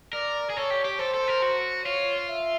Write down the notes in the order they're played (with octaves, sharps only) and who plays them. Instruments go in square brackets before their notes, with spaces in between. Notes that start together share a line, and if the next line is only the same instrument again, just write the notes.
[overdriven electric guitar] A#4 [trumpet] D5
[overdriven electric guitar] G#4
[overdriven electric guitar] A4 [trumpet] C#5
[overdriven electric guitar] G4
G4
[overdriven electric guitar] A4 [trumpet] C5
[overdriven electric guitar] A4
A#4
F#4
[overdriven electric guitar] F4 [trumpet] C#5
[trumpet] E5